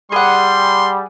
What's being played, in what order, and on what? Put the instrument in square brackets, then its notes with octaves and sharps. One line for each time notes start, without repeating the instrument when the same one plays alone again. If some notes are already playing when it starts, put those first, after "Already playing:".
[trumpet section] G3 [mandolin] G#4 F#5 [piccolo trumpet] C6